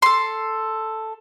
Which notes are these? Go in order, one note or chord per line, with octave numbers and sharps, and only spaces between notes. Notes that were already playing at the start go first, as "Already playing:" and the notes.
A4 C6